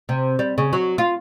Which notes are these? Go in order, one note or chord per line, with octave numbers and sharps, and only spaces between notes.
C3
G3
C#3
F#3
F4